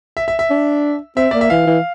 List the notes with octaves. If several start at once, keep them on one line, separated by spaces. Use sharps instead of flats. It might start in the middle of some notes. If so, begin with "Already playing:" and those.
E5
E5
E5
D4
C4 E5
A#3 D5
E5
E3 F5
E3